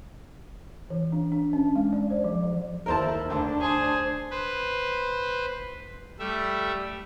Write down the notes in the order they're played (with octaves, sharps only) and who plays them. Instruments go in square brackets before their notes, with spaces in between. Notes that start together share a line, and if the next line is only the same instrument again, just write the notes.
[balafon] E3
D4
D4
C#4
G#3
D5
C5
F3
F3
[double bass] D#2 E4 [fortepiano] A#4 C5 A5
[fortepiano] D2 [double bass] D4
[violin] G#4 C5
[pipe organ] B4 C5
G3 A3 E5